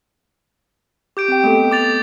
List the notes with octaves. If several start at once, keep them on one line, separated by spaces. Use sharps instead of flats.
G4 D6 G6 D7
C4 G5
A3 B3 A4
D6 A6 F7